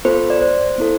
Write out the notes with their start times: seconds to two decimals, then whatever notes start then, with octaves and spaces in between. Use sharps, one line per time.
0.05 B3 F4 A4 C5
0.30 D5
0.42 C5
0.78 B3 E4 A4